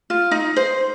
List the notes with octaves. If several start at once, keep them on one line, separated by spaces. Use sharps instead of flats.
F4
D#4
C5